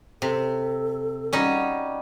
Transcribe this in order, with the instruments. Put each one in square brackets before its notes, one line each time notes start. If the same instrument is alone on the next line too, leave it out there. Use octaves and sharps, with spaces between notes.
[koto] C3 [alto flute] A4
[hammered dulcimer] G3 F#4 [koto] C#4 D#4